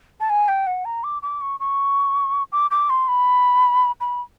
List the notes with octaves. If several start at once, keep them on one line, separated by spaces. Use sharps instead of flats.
A5
G#5
G5
F#5
A#5
D6
D6
C#6
C#6
D6
D6
C6
B5
B5